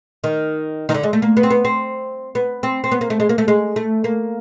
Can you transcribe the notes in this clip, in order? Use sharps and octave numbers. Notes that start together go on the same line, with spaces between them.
D#3
D#3
D3
G#3
A3
A#3
B3
C4
B3
C4
B3
C4
C4
B3
A#3
A3
G#3
A#3
A3
G#3
A3
A#3